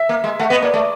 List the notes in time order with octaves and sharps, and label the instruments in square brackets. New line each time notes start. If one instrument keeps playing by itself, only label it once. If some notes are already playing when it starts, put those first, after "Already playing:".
Already playing: [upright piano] E5
[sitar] A#3
G#3
[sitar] A3 [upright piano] F#5
[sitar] B3 [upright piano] D#5
[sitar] A#3 [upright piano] D5
[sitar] A3 [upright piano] D5